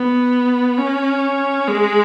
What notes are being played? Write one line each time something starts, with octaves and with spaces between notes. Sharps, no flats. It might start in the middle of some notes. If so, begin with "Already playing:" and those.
Already playing: B3
C#4
G#3